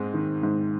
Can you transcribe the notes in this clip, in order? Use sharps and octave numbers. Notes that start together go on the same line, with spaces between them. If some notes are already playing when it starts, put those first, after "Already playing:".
Already playing: G#2 G#3 C4
D#3
G#2